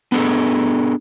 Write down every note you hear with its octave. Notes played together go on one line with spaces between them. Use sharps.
B3 D4 G#4 A4